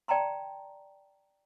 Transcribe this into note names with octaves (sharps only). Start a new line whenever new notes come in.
D5 G5 A5 A#5 C6